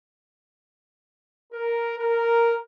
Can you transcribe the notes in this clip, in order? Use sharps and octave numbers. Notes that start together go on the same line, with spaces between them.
A#4
A#4